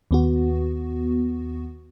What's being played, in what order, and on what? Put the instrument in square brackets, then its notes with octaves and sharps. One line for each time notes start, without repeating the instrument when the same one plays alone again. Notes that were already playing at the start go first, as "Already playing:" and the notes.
[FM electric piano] D#2 B3 F#4